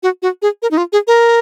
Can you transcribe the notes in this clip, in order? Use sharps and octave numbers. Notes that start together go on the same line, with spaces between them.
F#4
F#4
G#4
A#4
D#4
F4
G#4
A#4